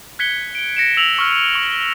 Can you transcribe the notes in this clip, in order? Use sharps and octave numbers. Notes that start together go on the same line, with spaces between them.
F#6 G#6 B6 C#7 G7
D7 G7
A#6 C#7 D7 E7
E6 F7 F#7
C#6 E6 F6
C#6